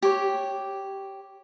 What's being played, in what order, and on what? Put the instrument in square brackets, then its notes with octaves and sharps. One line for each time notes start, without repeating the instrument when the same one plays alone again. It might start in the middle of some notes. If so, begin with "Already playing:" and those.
[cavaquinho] G4 C#5